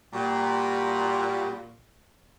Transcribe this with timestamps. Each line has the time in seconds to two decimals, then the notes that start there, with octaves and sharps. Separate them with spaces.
0.13 A#2 G3 F#4 G4